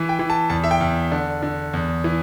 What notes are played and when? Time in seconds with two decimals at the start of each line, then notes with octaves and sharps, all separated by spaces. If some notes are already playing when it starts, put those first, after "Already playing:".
Already playing: E3
0.09 G5
0.19 E3
0.30 A5
0.50 E2 A5
0.64 E5
0.71 G5
0.81 E2
1.12 D3
1.42 D3
1.73 E2
2.04 E3